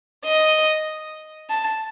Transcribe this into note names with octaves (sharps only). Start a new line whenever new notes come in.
D#5
A5